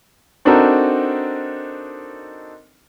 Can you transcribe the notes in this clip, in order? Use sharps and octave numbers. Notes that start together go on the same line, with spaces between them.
C4 D4 D#4 F#4 A4 A#4